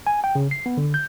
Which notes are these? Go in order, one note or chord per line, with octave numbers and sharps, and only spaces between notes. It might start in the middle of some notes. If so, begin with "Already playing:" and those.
G#5
G5
C#3
C7
B3
D3
G6